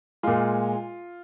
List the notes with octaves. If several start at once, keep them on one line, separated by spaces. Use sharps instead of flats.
A#2 G#3 F4